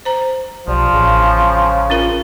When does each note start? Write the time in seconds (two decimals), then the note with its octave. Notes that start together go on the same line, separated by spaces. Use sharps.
0.05 C5 A#5
0.68 B1 F3 G3
0.94 A1 C#3
1.90 C#4 F4 A#4